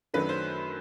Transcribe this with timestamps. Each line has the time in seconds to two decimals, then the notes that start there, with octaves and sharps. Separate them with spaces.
0.14 F#2 D#3 F#3 A3 D4 B4
0.29 C5